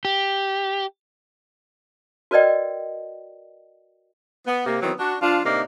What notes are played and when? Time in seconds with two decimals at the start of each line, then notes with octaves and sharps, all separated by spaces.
0.05 G4
2.31 F#4 A#4 B4 D5 D#5 G5
4.47 B3
4.66 C3 A#3
4.82 D#3 E3 F#3 B3 C4
4.99 D4 F#4
5.22 F3 D4 F4
5.45 A2 C3 A#3 D4 D#4